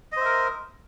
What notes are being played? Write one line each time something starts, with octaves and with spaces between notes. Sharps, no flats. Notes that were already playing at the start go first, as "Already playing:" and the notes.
A#4 C5 D#5 E5